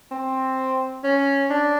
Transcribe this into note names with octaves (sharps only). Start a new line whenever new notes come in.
C4
C#4
D4